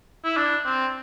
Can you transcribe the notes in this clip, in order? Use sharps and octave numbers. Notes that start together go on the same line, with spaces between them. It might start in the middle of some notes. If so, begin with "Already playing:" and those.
E4
D4
C4